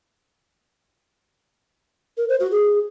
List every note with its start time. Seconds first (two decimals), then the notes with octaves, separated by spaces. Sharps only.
2.17 A#4
2.29 C5
2.40 F#4
2.51 G#4